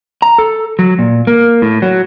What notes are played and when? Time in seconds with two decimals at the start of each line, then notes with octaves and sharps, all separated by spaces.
0.22 A#5
0.38 A4
0.79 F#3
0.99 A#2
1.27 A#3
1.62 A2
1.82 F#3